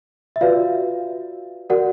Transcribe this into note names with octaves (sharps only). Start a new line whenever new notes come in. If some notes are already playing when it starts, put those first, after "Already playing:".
E5
F4 F#4 B4 D5 F5
F#4 A#4 D5 F#5